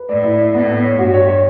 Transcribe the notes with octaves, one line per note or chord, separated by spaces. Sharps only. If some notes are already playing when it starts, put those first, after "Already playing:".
Already playing: B4
A2 D5
E4
D5
A2 B3
B3
C#5
G2 F#4
C#5
C#5